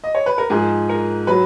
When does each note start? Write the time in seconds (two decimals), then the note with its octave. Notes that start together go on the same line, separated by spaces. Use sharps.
0.04 D#5
0.15 C#5
0.26 B4
0.38 A#4
0.50 G#2 F3 G#4
0.89 A#4
1.27 F#3 B4